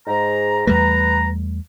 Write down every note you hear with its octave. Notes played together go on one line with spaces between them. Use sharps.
G#2 A#5
E2 G3 A3 B4 A#5